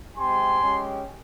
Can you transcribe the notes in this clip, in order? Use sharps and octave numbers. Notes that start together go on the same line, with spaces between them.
G#3 C4 G4 G#5 C6
G#3 C#4 G4